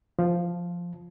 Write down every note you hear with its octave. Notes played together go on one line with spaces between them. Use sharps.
F3